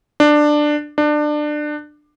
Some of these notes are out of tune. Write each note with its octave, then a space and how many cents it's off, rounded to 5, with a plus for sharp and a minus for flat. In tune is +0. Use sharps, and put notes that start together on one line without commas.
D4 +15
D4 +25